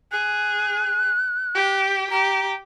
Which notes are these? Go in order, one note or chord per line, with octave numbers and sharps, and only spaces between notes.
G#4 F#6
G4
G4 A#5